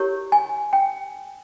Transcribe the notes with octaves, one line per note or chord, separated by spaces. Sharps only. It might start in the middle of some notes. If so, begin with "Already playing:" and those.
Already playing: E4 G4 A#4 C#5
G#5
G5